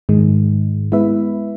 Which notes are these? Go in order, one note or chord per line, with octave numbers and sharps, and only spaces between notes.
G#2 D#3 G#3
G#3 B3 E4 B4 E5